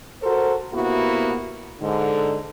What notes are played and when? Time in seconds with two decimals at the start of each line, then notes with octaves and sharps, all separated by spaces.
0.22 F#4 A4 A#4 C5
0.74 C3 A#3 B3 E4 F#4
1.81 G#2 D3